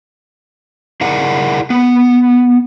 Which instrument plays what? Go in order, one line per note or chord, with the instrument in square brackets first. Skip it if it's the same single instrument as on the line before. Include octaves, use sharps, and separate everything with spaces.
[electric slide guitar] E4 G#4 A#4 D5 F#5
B3